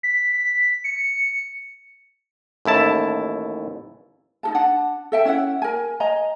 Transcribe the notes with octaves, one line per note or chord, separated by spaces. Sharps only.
B6
B6
C#7
A1 D#2 E4 A5
D#4 A4 A5
D4 F#5 A5
A4 E5 G5
C#4 E4 E5 F#5
A#4 G#5
D#5 G#5 A#5